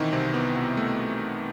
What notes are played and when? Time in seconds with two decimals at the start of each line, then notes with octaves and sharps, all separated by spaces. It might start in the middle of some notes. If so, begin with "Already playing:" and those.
Already playing: B2 D#3 E3 C4 D#4 E4
0.12 C2 C3 C4
0.34 B3
0.56 B2 B3
0.77 A3